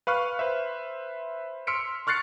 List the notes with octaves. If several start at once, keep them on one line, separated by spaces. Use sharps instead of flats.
B4 F5 C#6 F6 F#6
B4 C5 E5
C6 E6 F6 B6 C#7 D7
C#6 F6 F#6 A6 C7 C#7